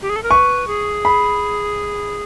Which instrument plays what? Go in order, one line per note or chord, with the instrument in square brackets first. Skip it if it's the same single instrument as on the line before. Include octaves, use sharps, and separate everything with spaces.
[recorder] G4
G#4
A4
A#4
[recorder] B4 [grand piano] C#6
[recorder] G#4
[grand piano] B5